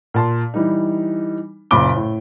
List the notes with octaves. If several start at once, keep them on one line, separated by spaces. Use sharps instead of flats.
A#2 A5 C6
E3 G3 D#4
F#1 A#2 C#3 B5 D6 G7
A2